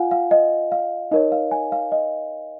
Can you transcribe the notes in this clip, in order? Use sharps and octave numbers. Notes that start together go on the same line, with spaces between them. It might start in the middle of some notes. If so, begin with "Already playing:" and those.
Already playing: F4 F5 F#5 G#5
F5
D#5
F5
D#4 A#4 C#5 D#5
F5
G#5
F5
D#5